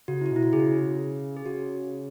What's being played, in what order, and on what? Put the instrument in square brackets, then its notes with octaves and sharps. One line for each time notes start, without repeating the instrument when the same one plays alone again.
[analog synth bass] C#3 [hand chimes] F#4
[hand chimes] E4
F#4
[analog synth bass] B2 [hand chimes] E4
[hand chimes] F#4
[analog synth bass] C#3 [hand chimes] G#4
[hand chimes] F#4
G#4
[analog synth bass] C#3 [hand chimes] F#4